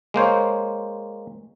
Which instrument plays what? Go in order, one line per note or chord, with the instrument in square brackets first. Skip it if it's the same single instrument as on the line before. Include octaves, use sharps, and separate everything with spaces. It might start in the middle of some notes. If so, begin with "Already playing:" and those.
[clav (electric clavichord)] G#3 A#3 C5 C#5